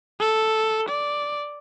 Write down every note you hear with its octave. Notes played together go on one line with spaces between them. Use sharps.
A4
D5